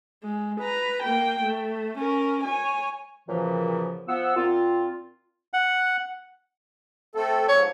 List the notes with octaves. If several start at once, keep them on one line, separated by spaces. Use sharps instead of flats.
G#3
B4 A#5
A#3 G5
A3
C#4 A#4
C#5 G#5
F#2 A#2 C#3 E3 F3
F3 B3 F#5 E6
A#2 C4 F4
F#5
A3 C4 A4
G#2 F3 C#5